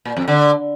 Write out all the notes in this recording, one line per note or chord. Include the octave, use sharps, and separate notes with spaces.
A#2
F2
D3